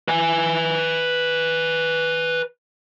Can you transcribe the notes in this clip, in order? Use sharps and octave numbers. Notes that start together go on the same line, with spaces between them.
B4 G#5